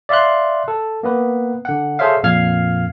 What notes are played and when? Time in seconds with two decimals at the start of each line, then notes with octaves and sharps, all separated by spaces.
0.09 D5 E5 F5 C6 F#6
0.68 A4
1.03 A#3 B3 B4
1.65 D3 F#5
1.99 G#4 A4 C5 C#5 E5 F5
2.23 F2 A#2 F5 F6 G#6 C7